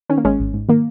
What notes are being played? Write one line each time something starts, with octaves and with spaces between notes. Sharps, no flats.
D#3 C#4
A#3
G#1 G#3 C#4
G#1
G#2
D#3 A#3